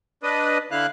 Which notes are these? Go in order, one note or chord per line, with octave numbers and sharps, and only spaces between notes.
D4 B4 D#5
D3 E4 F5 F#6